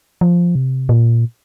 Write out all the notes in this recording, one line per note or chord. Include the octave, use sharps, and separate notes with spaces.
F3
C3
A#2